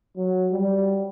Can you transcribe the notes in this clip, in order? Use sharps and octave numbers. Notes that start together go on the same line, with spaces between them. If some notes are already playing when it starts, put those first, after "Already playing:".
F#3
G3